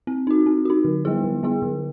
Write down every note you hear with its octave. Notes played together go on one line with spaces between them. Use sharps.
C4
D#4 F#4
C4
D#4 F#4
D3
G3 B3 E4 G#4
D3
G3 B3 E4 G#4
D3